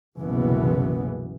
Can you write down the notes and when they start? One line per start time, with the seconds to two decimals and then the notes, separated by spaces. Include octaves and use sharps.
0.19 F#1 C2 B2 E3 B3